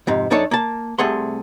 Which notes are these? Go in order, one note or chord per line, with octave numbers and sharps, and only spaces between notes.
F2 G#2 C3
F#2 D4 D#4 A4 C#5
A#3 A5
C2 C3 A3 G#4 F#5 C6